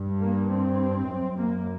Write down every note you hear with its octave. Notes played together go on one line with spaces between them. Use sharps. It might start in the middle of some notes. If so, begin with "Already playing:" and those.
Already playing: G2
A#3
C4
F#2
A#3